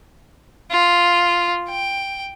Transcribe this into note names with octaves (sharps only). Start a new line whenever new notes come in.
F4
G5